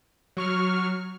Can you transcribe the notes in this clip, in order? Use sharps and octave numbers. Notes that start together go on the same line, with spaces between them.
F#3 C#6 F6